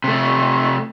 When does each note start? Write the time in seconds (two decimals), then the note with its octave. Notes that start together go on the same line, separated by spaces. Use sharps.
0.04 C3 A3